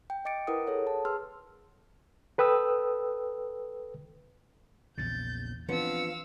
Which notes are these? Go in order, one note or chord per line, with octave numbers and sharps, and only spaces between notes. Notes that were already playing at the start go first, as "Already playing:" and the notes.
G5
D#5 G5 D6 A6 C#7 D7
E4 A#4 B4 F#5 D#6
G#4 A4 C#5 F#5
A5
G#4 B4 C6 E6 F6
A4 B4 G5 D#6 E6
A#1 E2 C#3 G6 A6
E3 F3 B3 C4 D4 F5 E6 C#7